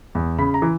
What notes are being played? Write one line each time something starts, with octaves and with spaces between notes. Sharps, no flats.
E2
C#3 B5
A#5
E3